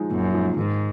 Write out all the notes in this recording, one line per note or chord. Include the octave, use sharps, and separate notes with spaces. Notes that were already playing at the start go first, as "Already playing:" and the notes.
Already playing: F3 G#3 D#4
F#2 A#2
F3 G#3 D#4
G#2 D#3